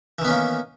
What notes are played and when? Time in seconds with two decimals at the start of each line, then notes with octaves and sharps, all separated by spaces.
0.19 E3
0.22 D#3
0.25 B3
0.28 C#4
0.31 A#3